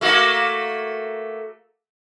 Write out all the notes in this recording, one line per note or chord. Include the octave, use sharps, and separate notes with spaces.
A3 A#3 F#4